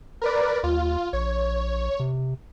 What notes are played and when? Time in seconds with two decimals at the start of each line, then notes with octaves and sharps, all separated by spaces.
0.22 A#4 B4 D5
0.64 D#2 F4
1.13 A#1 C#5
2.00 C3